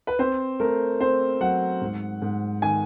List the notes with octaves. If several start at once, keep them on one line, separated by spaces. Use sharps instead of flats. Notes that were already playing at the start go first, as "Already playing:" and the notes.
B4
C4 C5
A3 A#4
C4 C5
F#3 F#5
G#2
G#2
D#3 G#5